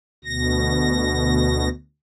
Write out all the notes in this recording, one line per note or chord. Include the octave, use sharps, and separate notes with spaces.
D2 B2 A#6